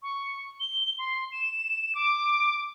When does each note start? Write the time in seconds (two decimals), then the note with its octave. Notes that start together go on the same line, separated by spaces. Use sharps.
0.03 C#6
0.60 G7
0.99 C6
1.32 E7
1.95 D6